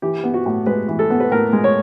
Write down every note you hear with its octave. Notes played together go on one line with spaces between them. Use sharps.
E3 G4
B3
F#4
A2
G#3 B4
E3
A4
B3
B4
A2 A#4
G#3
C#5